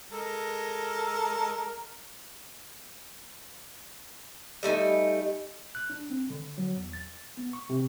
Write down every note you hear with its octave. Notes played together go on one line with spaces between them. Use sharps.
G#3 A4 A#4
G3 A3 D#4 G#5
F#6
D4
C4
D3
F#3
E2
A6
B3
C#6
C3